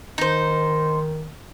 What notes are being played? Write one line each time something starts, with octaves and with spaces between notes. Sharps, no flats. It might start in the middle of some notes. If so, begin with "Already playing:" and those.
D#3 D#4 C5